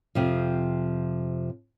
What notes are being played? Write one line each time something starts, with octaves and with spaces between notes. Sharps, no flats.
F2 C3 F3